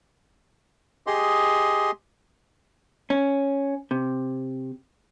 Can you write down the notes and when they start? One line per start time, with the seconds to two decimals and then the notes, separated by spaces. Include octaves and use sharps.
1.07 G4 G#4 D#5 C6
3.10 C#4
3.91 C3